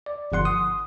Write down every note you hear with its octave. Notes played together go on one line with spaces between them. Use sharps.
D5
G1 F3 F#5 C6
D#6